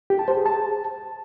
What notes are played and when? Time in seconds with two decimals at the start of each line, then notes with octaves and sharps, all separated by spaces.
0.10 G4
0.19 A5
0.28 C5
0.37 G#4
0.46 A5